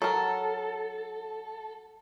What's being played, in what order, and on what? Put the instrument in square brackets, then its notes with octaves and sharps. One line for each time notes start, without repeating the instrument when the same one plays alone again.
[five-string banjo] F#3 A#4 [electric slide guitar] A4